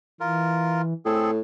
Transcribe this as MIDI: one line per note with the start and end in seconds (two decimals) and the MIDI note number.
0.20 0.93 52
0.20 0.82 65
0.20 0.82 70
1.05 1.40 45
1.05 1.31 60
1.05 1.31 68
1.05 1.31 69